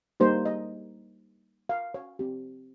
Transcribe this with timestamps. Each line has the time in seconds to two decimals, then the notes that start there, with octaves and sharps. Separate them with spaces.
0.20 G3 A#3 D#4 G4 C5
0.45 D#5
1.69 F5
1.94 C#5
2.19 C4 G4